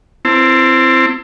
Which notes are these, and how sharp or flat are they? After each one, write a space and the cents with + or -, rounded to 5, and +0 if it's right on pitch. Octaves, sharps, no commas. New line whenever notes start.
C4 +0 E4 +25 A5 +40